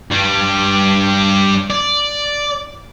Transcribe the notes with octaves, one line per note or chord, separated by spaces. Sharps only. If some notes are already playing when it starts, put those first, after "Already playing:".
G2 G3
D5